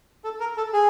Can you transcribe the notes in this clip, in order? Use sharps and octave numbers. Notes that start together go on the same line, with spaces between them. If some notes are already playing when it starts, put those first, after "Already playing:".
A4
A#4
A4
G#4